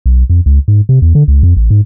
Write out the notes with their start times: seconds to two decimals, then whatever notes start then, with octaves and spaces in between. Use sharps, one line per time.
0.06 B1
0.30 F2
0.46 C#2
0.68 G#2
0.89 C3
1.02 E2
1.15 D3
1.28 C#2
1.43 F2
1.57 A1
1.71 G#2